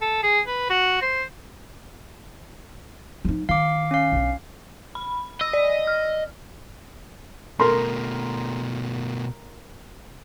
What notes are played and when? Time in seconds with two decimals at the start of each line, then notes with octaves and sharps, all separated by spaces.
0.01 A4
0.23 G#4
0.47 B4
0.70 F#4
1.02 C5
3.25 F3 D#4
3.49 D#3 F5 D6
3.91 C#4 F5
4.12 B1 D4
4.95 B5
5.41 D#5 E6
5.53 D5
5.87 F6
7.60 B2 A3 A#4 C6